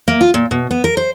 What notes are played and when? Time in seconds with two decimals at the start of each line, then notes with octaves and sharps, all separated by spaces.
0.08 A#3
0.21 F4
0.34 A#2
0.51 B2
0.71 B3
0.84 A#4
0.97 C5